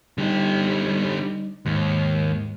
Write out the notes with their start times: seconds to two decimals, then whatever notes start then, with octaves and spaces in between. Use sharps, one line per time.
0.18 D3 G3 D#4 G4
1.66 D#2 G#2